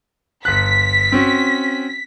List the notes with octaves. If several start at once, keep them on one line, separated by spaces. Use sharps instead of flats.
G1 F#6 B6
C4 C#4 F#4